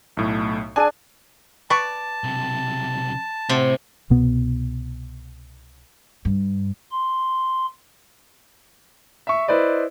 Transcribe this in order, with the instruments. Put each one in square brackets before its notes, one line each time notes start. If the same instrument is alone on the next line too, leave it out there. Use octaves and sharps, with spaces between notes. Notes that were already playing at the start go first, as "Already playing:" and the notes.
[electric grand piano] B1 A2 A3
[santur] D4 G#4 [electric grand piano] G#5 D#7
[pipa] B4 C#6 [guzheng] D5 [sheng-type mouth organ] A5
[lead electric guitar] B1 C3
[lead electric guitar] A2 [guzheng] C3
[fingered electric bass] C2 B2 B3
[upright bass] G2
[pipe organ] C6
[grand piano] E5 C#6
E4 B4 C5 D5 D#5